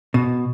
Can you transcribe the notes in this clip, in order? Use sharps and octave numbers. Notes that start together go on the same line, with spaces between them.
B2